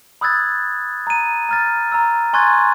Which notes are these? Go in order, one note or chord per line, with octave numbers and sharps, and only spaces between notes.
B5 D#6 E6 F#6 G#6 A6
A#5 D#7
A#5 F6 A6
A#5 E6
G#5 C6 C#6 F#6 G#6 A6